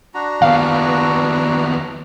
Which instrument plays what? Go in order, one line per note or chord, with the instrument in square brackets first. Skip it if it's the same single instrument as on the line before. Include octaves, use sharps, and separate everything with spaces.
[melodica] D4 F#4 A#5
[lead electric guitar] D#2 B3 [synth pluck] F5